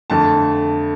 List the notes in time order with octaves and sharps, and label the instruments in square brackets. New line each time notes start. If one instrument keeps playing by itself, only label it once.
[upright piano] F2 D3 A3 A5